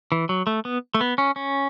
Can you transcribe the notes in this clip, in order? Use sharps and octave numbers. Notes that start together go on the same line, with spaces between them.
E3
F#3
A3
B3
A3
B3
C#4
C#4